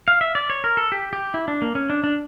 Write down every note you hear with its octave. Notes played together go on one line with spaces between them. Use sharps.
F5
E5
D5
C#5
A#4
A4
G4
G4
E4
D4
A#3
C#4
D4
D4